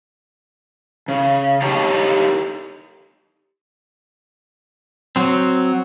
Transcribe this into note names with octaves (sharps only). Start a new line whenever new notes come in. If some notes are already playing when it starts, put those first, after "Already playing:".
C#3
D#4 G4 A4 C#5
F#3 C4